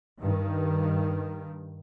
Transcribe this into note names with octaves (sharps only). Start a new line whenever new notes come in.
G2 D#3